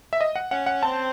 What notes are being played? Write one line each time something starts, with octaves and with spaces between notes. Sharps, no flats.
E5
D#5
F#5
C#4 F#5
F#5
C4 A5